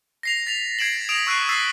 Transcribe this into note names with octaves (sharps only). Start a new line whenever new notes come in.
A#6 C7 F7
A6 B6 F7
G#6 C7 D7 E7 F#7
D#6 A#6 B6 D7 E7 F7
C#6 E6 F#6 C7 D7 D#7
E6 A6 B6 C7